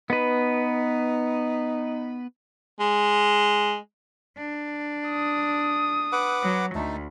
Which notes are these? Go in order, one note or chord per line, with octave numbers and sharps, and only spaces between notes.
B3 D#4 B4
G#3
D4
D#6
B4 F#5 D6
F#3
D2 A3 D#4 A4